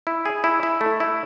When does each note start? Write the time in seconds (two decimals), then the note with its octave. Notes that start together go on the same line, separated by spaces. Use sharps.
0.07 E4
0.25 G#4
0.44 E4
0.63 E4
0.81 A3
1.00 E4